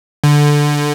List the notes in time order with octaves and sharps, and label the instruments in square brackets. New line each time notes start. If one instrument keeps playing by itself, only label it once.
[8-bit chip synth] D3